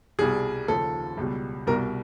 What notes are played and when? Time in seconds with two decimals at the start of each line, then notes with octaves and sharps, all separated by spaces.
0.19 C2 B2 G3 G#4
0.68 D#2 C#3 F3 A4
1.17 C#2 B2 G3
1.67 C2 B2 G3 A#4